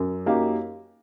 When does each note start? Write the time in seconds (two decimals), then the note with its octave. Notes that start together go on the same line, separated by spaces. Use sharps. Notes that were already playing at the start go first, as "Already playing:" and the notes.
Already playing: F#2
0.26 F#2 F#3 A#3 D#4 G4